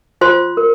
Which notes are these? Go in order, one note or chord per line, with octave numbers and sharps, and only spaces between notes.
F4 C5 C6
A#4